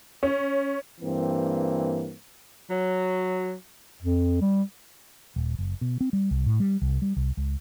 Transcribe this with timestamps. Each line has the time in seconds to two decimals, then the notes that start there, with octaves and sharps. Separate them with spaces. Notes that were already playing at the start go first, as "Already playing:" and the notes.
0.23 C#4
1.01 G2 E3 A#3 C4
2.69 F#3
4.03 F2
4.41 G3
5.36 D#1
5.59 F#1
5.81 B2
6.01 C4
6.13 G3
6.31 C2
6.46 A2
6.60 G3
6.82 C2
7.02 G3
7.16 C2
7.37 C#2